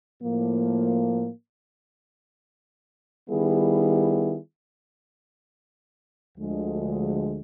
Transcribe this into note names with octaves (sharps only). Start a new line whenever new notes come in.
A2 F3 A#3
D#3 G3 B3 E4 G#4
D2 D3 F3 G#3